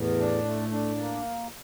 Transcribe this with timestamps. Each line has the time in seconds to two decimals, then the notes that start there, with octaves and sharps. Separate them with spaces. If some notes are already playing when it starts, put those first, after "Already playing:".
Already playing: E2 A2
0.18 D4
0.45 A3
0.71 D4
0.98 A#3